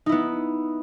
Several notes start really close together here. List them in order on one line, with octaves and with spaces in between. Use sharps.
D#4 E4 B3